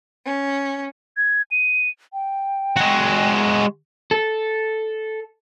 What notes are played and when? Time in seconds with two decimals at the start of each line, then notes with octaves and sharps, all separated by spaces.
0.24 C#4
1.17 G#6
1.51 D#7
2.13 G5
2.76 G#3 F#4
4.11 A4